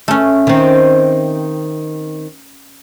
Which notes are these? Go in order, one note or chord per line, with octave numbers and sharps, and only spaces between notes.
A3 C#4
D#3 C4